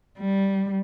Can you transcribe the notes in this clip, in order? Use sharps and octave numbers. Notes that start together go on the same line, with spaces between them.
G3